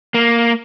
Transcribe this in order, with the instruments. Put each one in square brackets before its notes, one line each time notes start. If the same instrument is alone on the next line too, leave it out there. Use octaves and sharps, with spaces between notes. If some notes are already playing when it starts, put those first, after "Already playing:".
[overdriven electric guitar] A#3